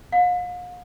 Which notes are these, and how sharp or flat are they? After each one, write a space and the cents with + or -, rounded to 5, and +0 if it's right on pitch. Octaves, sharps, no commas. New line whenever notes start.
F5 +45